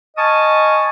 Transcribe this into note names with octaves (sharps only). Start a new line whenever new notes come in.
D#5 G#5 A5 C#6 D#6 F6